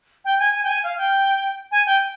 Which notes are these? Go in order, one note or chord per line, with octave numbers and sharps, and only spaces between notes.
G5
G#5
G#5
G5
G#5
F5
G5
G#5
G5